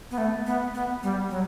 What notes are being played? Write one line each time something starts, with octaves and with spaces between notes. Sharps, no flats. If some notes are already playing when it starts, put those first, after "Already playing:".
B3
A3
B3
B3
G3
F#3